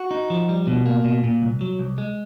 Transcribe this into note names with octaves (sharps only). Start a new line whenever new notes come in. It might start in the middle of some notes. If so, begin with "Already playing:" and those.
Already playing: F#4
D#4
F3
G3
B2
A#3
B2
A#2
C2
F#3
C2
G#3